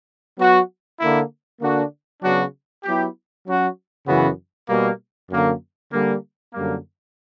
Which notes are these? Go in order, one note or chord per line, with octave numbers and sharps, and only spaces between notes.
F#3 B3 F#4
D3 A#3 E4
D3 A#3 D4 F#4
C#3 F#3 B3 D4 F#4
F#3 B3 E4 G4
F#3 C#4 F#4
F#2 C#3 E3 B3 F#4
B2 G3 A#3
F#2 D3 A#3
D3 G3 A#3
F#2 D3 G3 A#3